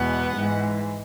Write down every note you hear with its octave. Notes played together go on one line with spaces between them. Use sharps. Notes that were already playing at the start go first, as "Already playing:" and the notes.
Already playing: E2 B2 G#3 B3 F#5
G#2 E3 G#3